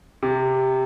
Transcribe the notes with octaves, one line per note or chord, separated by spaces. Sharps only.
C3